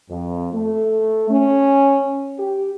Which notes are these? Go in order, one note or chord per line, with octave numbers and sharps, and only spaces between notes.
F2
A3
C#4
G4